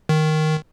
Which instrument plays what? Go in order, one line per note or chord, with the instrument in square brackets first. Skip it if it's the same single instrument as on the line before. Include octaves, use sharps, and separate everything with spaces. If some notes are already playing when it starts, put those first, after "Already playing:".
[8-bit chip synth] D#3